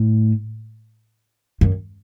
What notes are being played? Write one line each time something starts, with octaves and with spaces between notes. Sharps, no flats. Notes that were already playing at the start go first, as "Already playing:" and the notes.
Already playing: A2
F#2